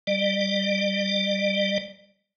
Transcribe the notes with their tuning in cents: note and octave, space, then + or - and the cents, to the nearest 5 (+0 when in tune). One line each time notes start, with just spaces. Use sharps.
G3 +0 D5 +40